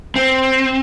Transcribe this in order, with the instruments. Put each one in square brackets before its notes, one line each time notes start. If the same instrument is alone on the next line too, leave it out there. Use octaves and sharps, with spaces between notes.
[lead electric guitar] C4